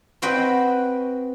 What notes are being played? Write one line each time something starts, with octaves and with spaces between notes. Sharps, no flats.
C4 F#4 B4 D#5 G5